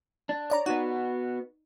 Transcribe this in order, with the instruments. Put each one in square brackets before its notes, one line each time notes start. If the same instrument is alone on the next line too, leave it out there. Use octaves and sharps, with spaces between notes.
[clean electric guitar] D4
[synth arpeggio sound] C#5 D5 A#5
[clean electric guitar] B3 F#4 [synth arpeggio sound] D#4